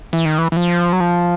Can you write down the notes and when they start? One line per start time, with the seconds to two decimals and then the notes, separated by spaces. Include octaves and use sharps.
0.13 E3
0.25 D#3
0.38 E3
0.52 E3
0.57 F3
0.93 F#3
1.00 F3